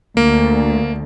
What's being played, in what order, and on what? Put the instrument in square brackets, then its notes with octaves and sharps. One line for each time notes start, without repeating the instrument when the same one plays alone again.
[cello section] D2 [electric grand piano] A#3